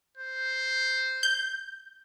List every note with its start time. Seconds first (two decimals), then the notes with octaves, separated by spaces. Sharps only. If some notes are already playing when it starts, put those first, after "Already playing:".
0.17 C5
1.23 G6